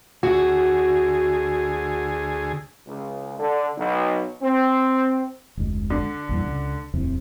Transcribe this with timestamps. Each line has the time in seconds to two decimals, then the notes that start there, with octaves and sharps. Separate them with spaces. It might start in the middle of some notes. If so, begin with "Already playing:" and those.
0.23 D2 F#4 G#4
2.88 C#2
3.40 D3
3.78 B1
4.43 C4
5.57 F1 D2 G#3
5.90 D3
6.29 A#1 E2 G2
6.46 C#2
6.94 D1 E2 C3